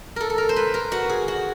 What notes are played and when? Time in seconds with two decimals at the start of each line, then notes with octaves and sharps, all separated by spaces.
0.16 A4 A#4
0.30 A4
0.38 A#4
0.49 C5
0.56 B4
0.74 A#4
0.92 F#4
1.09 G#4
1.28 F#4